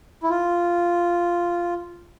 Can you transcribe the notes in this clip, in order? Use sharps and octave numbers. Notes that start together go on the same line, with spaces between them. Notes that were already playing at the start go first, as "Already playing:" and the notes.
E4
F4